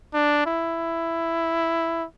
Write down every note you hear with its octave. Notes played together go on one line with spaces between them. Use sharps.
D4
E4